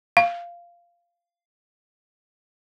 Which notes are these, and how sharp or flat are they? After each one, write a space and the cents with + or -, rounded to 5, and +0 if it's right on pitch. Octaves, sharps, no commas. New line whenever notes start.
F5 -10